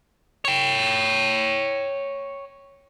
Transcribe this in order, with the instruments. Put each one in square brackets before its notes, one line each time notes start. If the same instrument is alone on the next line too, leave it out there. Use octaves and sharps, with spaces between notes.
[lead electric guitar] C#5 G5